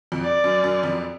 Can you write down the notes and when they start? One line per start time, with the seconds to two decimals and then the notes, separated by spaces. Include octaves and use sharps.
0.12 F2
0.24 D5
0.44 F#2
0.64 F#2
0.83 F2